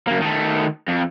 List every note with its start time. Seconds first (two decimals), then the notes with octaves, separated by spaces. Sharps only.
0.08 F#2 A#3
0.22 D#3 A3
0.88 F2